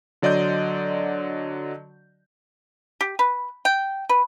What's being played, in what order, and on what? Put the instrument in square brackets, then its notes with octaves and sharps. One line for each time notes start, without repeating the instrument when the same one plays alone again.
[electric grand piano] D3 F#3 D5 D#5 C6 G6
[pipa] G4
B4
G5
B4